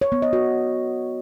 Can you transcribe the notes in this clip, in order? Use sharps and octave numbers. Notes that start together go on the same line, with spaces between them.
C#5
B3
D#5
F#4